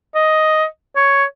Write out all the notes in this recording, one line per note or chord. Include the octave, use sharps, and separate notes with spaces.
D#5
C#5